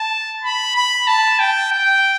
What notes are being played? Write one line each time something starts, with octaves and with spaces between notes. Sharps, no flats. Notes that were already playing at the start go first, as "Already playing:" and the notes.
Already playing: A5
B5
B5
A5
G5
G5